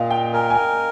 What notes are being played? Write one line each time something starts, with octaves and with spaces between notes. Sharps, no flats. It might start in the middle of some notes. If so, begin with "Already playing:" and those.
Already playing: A#2 D#5 F5 G5
G5
A#4 G#5
G#5
G5